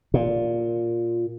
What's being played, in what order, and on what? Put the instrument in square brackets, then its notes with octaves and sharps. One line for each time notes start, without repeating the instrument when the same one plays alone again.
[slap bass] A#2